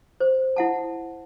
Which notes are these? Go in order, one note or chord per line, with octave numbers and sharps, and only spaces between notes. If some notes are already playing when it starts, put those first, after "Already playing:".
C5
E4 F#5 A5